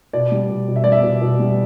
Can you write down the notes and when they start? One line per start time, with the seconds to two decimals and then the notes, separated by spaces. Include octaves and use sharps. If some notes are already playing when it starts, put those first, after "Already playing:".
0.13 B2 D5
0.32 G3
0.49 B2
0.68 B2
0.76 E5
0.84 G3 D5
0.92 E5
1.03 B2
1.22 B2
1.39 G3